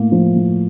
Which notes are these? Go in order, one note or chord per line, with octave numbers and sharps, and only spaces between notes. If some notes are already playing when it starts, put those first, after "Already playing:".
Already playing: A2 A#3
F3
A2